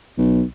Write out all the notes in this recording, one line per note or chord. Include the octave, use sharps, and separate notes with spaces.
B1